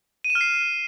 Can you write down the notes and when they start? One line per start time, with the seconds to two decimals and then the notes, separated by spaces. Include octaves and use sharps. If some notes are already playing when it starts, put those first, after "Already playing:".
0.24 D#7
0.30 E7
0.35 F6
0.41 C7